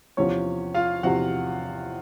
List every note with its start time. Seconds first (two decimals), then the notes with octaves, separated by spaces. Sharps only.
0.17 E2 C3 F3 C#4 C#5
0.74 F4 F5
1.03 E2 C3 F3 F#4 F#5